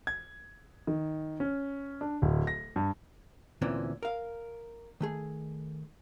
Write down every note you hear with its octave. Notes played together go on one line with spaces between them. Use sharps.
G#6
D#3
C#4
D4
D1
A#6
G2
D2 A#2 E3 C4 C#4
A#4 F5
D#3 A3 G#4